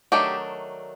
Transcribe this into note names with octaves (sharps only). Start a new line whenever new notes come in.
D#3 F#3 A3 D4 G4